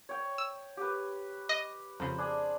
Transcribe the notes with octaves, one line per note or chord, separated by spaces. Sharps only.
C#5 G5
E6
G4 B4
D#5
F2 C#3 C5 A#5 B5
D4 G#4